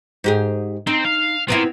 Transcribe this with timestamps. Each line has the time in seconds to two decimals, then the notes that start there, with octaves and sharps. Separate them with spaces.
0.24 G#2 G4 G#4
0.87 C4 D#4
1.05 F5
1.48 B3 C4 E4 F4 A#4